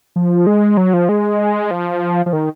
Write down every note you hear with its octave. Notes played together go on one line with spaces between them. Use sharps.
F3
G#3
F#3
F3
G#3
F3
F3
D#3